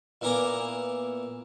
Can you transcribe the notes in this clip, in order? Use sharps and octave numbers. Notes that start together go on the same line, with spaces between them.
A#2 E3 B3 A#4 A#5 D6